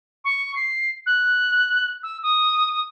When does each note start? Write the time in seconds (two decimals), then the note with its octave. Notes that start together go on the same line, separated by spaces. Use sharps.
0.24 C#6
0.55 C7
1.06 F#6
2.03 E6
2.23 D#6